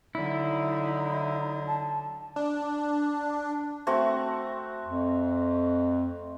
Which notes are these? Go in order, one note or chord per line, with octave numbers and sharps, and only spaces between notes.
D3 F#3 D#4 E4
A5
D4
A3 C4 F#4
F2